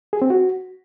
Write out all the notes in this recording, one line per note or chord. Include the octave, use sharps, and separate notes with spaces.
G#4
C4
F#4